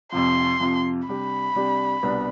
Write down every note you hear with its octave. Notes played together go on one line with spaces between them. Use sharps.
F2 C3 F3 C6
F2 C3 F3
C3 G3 D4 G4 B5
C3 G3 D4 G4
C2 B2 G3 B3 D4